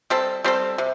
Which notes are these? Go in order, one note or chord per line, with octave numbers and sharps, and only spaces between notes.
G3 C4 A4
G3 C4 A4
C3